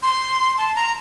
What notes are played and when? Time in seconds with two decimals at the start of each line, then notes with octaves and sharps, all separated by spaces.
0.03 C6
0.58 A5
0.76 A#5